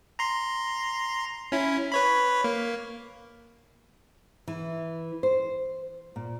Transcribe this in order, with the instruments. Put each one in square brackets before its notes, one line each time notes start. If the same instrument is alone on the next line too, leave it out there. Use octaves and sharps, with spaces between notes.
[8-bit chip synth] A#5 C6
C#4 E4
B4 C#5 B5
A#3
[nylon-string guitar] E3
C5
A#2